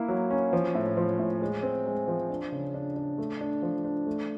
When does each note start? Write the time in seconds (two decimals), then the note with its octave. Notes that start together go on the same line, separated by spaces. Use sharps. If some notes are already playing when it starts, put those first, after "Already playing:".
Already playing: A#3 E4
0.08 F#3
0.30 C#4
0.53 F3
0.75 A2
0.97 F3
1.19 A2
1.41 G#3
1.63 C4
1.86 G#3
2.08 F3
2.30 D4
2.52 C#3
2.74 D4
2.96 D4
3.18 A3
3.41 D4
3.62 F3
3.85 D4
4.07 A3